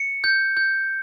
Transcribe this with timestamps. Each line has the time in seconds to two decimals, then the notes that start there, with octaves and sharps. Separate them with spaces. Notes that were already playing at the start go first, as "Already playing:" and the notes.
Already playing: C#7
0.24 G6
0.57 G6